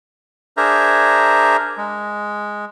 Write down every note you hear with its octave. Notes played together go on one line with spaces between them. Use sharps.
D4 G#4 A#4 C5 E5 A#5
G#3